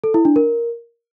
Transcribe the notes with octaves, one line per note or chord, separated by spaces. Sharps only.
A4
E4
D4
A#4